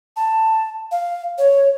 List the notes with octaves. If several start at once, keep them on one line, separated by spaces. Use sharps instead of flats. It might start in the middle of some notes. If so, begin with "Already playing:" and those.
A5
F5
C#5